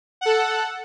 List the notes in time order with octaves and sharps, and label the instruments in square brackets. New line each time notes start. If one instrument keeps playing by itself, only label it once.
[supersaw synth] A4 F#5